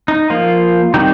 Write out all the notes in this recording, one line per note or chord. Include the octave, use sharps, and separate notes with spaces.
D#4
F3 A#3 F4
D#3 G3 C4 D#4 G4